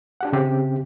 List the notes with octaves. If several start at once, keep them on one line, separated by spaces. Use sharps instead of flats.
D4 G4 F#5
C#3 C4 G4